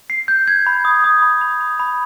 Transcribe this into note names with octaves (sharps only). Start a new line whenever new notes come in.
C7
G6
G#6
B5
D#6
D#6
B5
B5
B5
B5